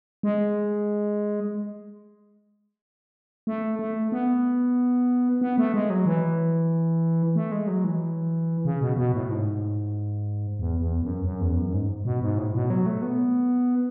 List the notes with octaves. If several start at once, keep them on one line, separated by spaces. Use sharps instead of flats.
G#3
A3
A3
B3
B3
A3
G#3
F#3
E3
A3
G#3
F#3
E3
C#3
B2
B2
A2
G#2
E2
E2
F#2
F#2
E2
F#2
G#2
B2
G#2
A2
B2
F#3
A3
B3